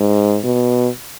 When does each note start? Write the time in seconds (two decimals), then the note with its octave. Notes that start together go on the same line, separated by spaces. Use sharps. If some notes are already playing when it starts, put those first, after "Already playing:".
Already playing: G#2
0.44 B2